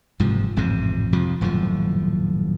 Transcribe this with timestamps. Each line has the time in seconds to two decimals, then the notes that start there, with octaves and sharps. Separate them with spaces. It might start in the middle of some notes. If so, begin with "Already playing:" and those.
0.20 F#1 G#2 C3 F3
0.56 A1 F2 G#2 C3
1.13 F2 C3 F3
1.41 D#1 F#2 A2 F3